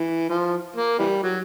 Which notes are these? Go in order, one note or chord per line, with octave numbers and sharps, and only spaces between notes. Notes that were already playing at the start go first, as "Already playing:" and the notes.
Already playing: E3
F3
A#3
E3 G3
F#3